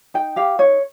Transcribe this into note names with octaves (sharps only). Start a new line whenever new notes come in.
D#4 G5
G4 F5
D#4 C#5